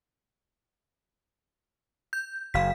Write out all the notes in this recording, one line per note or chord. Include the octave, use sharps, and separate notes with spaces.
G6
F#1 F5 B6